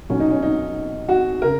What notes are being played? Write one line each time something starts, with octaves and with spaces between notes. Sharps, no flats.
B1 A#2 F#3 C#4
D#4
C#4
D#4
F#4
C#3 A#4